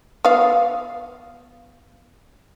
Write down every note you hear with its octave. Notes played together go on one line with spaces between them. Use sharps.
B3 F5